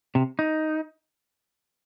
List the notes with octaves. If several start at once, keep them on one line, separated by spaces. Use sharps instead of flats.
C3
D#4